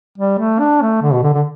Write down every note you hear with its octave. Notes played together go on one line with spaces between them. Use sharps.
G3
A3
D4
A3
D3
B2
D3
D3